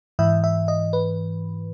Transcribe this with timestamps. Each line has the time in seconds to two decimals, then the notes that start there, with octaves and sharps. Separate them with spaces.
0.19 G#2 E3 E5
0.44 E5
0.68 D#5
0.93 B4